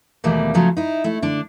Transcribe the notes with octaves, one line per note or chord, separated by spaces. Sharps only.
D#2 B2 E3 G3 A3 A#3
C#3 F3 F#3 A3 C#4
D#4 E4
A3 E4
D3 D4